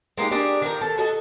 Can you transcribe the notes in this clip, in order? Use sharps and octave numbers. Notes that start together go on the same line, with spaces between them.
G#3 A#3 D#4 G4
D4 G4 G#4 A#4
D#3 F3 A#4
A4
F#4 A4 D#5